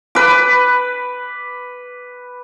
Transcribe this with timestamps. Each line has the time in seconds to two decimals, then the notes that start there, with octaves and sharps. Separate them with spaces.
0.15 B4 D6